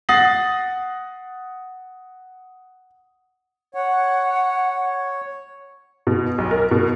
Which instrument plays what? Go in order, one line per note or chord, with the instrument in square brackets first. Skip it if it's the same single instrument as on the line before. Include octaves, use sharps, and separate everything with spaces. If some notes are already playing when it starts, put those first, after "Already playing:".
[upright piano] F#5 D#6 A6 A#6 C7 F#7
[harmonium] C#5 [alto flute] F#5
[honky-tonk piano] B2
B1
A#4
B2